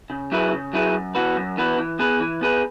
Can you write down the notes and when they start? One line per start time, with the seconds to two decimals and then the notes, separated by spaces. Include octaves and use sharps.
0.10 C#3
0.31 F#3 E4 G#4 B4
0.52 C#3
0.73 F#3 E4 G#4 B4
0.94 F#2
1.15 E3 B3 F#4 B4
1.36 F#2
1.57 E3 B3 F#4 B4
1.78 E3
1.99 B3 G#4 B4
2.20 E3
2.41 B3 G#4 B4